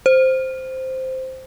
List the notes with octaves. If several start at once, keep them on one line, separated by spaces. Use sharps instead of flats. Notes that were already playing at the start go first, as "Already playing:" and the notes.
C5